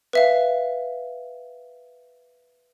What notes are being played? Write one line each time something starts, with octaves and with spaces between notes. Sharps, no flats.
B4 E5 F5